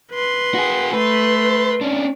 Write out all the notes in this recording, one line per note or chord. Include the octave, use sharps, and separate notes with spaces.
B4 C6
F#4 G#4
A3 B4 C6
C#4 D4